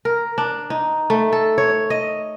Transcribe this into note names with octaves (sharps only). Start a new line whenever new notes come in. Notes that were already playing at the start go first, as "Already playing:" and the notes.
A#4
D4
D#4
A3
A4
C#5
D#5